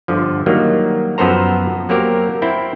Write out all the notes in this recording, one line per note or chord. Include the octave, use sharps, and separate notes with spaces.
G1 D3 F3
D#3 F#3 G3 A#3
F#2 F3 B3 A4 C5 A#5
F#3 A#3 C4 G4 A#4
C4 E4 G5